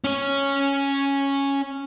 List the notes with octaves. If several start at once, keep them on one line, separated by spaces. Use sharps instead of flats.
C#4 C#5